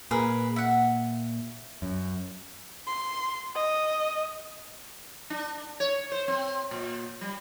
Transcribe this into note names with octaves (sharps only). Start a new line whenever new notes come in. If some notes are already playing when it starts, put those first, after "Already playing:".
A#2 G#4 A#4 B4
E5 F#5
F#2
C6
D#5
D4
C#5
C5
C4
A#2
G3